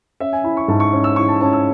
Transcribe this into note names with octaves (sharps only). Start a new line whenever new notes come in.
C#4 E5
G#5
E4 B5
C#6
G#2 A5
C#6
C#4
E6
E4 C#6
A5
C#4 A5
E6